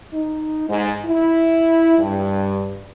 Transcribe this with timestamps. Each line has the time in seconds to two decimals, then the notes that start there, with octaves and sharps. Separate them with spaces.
0.13 D#4
0.69 G#2
1.05 E4
1.99 G2